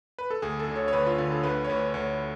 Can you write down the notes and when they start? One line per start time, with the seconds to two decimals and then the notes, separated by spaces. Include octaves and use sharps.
0.19 B4
0.31 A4
0.42 D2 G#4
0.59 A4
0.68 D3
0.76 C#5
0.88 C#5
0.93 D2 B4
1.06 F4
1.18 D3 F4
1.32 A4
1.43 D2 B4
1.64 C#5
1.69 D2 B4
1.94 D2 C#5